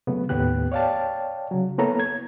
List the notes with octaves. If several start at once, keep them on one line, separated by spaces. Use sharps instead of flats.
C#3 F#3 A3 B3
D#2 A2 B3 G4 F#6
C#5 D5 F5 G5 A5
C#3 F#3
A#3 B3 E4 A4 C#5 A#5
G#6